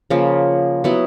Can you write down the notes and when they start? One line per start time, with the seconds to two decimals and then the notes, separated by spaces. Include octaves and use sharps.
0.10 C#3 F3 A#3
0.84 F#3 B3 E4